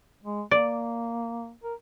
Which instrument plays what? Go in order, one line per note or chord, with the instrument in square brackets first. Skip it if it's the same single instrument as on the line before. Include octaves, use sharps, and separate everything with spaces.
[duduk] G#3
[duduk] A#3 [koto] D5
[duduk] A#4